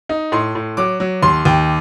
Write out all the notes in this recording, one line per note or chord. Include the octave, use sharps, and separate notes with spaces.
D#4
A2 C6
A2
F#3 D6
F#3
D#2 C6
D#2 G5